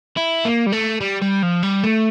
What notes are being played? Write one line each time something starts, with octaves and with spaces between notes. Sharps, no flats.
E4
A#3
G3
A3
G3
G3
F3
G3
A3